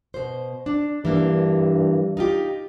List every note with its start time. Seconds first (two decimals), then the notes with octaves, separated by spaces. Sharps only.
0.14 B2 C5
0.66 D4
1.05 G2 E3 A#3 D4
2.17 D#4 F4 G4